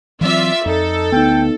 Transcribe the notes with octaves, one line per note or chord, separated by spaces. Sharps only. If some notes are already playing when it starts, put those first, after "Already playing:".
E3 F#3 C4 F4 D5 E5
F2 D#4 A4
D2 B3 D#4 G5